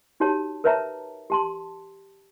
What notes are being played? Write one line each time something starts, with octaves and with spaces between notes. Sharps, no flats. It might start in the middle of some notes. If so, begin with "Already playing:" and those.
D#4 F#4 G4 C#5 A5
A#4 B4 C#5 E5 A5 A#5
G4 A5 C6